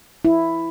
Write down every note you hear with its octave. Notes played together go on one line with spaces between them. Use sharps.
E4